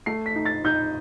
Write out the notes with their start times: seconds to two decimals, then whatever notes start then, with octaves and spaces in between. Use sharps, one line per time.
0.06 A3 C7
0.26 B6
0.36 D#4
0.45 A6
0.64 D#4 G6